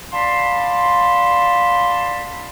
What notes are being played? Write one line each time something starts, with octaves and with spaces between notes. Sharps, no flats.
D5 F5 A5 B5 C6